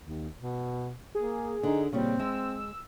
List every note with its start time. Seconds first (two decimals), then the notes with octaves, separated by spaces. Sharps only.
0.02 D#2
0.38 B2
1.15 A#3 G#4
1.63 D3 D#4
1.93 A#2 C#3 G3 C4
2.20 G#3 E6